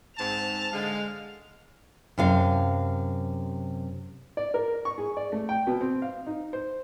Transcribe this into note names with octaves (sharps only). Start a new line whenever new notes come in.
G#2 C4 A5 F7
D3 G#3 F5
F#2 C3 F5
D5
A#4
C#6
G#4
D5
A3
G5
B2
C4
F5
D#4
C5